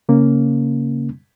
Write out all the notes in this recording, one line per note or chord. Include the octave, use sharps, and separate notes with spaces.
C#3 A#3 C#4